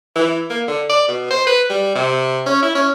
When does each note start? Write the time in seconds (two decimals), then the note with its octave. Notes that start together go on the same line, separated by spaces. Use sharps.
0.16 E3
0.50 A#3
0.68 D3
0.89 D5
1.08 B2
1.31 C5
1.47 B4
1.70 G3
1.95 C3
2.46 C#4
2.62 E4
2.75 C#4